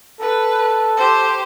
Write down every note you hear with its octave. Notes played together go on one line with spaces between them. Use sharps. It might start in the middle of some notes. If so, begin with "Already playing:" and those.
A4 B4
G4 C5